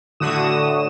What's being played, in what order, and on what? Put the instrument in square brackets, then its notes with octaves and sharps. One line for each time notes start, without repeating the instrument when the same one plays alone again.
[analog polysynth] A2 D3 F#4 D#6 E7